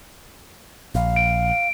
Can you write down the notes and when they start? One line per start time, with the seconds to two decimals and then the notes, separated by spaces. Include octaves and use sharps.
0.95 A#1 F5
1.16 D7